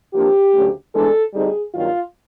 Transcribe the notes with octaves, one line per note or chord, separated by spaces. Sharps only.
C3 F3 A#3 D4 G4
D2 C#3 F#3 A3 C#4
A2 E3 G#3 B3 D4 A4
D2 D3 G3 C4 D#4 G#4
G2 D#3 F#3 A#3 F4